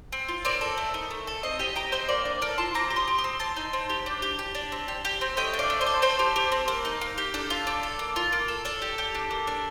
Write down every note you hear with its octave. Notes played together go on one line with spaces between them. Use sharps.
C4
F4
C4 A#4 D5
A4
A3
D#4
A3
A4
C4 C5 D#5
G4 D#5 G5
G4 G5 A#5
C4 C5 D#5
A#3 A#4 D5
D4
A4 A#4 D5
F4 A5 C6
C4 A#5 D6
G4
C6 D#6
G4
C6 D#6
C4
C4 A5 C6
D#4
C4
G4
D4
G4
G4
D4
C4
G4
G4
C4
A3 D#5 G5
D4
D5 F5
A3
C5 D#5
A4
C4 A4 C5
G4
G4
C4
A#3
D#4
A#3
G4
D4 A4
F4
D4
A4
A#3
F4
A#3
A4
D4 A4
G4
G4
D4
A#3
D4